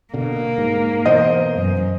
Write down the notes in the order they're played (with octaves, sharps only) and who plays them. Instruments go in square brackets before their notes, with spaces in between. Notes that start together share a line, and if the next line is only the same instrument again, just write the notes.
[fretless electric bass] B2 D3 [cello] A#3
[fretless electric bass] G#2
[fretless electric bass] B2 E3 B3 [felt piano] C5 D#5
[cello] F#2